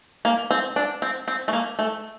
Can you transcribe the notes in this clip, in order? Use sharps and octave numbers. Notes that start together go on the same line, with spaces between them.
A#3
C4
D4
C4
C4
A3
A#3
A3